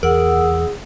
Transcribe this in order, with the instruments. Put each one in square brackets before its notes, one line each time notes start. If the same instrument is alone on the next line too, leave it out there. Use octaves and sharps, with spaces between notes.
[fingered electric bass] E2 [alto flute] G#4 [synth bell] A#4 [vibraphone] F#5 E6